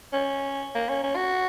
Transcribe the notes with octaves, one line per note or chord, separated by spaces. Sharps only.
C#4
A#3
C#4
C#4
F#4